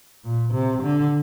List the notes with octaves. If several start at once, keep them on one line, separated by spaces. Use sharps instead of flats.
A#2
C3
D3